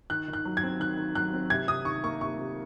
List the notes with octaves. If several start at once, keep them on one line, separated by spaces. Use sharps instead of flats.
D#3 F#6
D#3
F#6
F#3
G#6
C4
D#3 F#6
D#3
F#3 F#6
C4
C3 G#6
C3 D#6
D#3 C#6
A#3 C#6
C3 C#6
C3